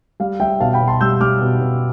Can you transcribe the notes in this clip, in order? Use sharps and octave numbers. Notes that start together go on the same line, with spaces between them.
G3 F5
G3 E5 G5
B2 F5 A5
G5 B5
B2
A5 C6
G3 E6 G6
G3 D6 F6
B2
B2